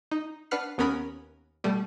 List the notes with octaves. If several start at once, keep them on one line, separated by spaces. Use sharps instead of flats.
D#4
D4 B4 F#5 F6 F#6 C7
D#2 B3 C#4 A#4 B5 D#6
B2 G3 A3